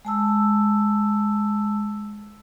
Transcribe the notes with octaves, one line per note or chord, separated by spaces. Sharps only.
G#3 A5 E6